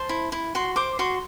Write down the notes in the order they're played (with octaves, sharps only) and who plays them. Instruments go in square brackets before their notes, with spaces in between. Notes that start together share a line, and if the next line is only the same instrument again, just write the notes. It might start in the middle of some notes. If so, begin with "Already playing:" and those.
Already playing: [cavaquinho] C5 A5
E4
E4
F#4 C6
C5 D6
F#4 C6